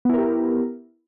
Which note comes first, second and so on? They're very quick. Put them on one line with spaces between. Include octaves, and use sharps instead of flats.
B3 E4 A#4 G4